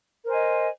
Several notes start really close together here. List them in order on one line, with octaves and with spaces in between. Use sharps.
A#4 C5 G#5 D#5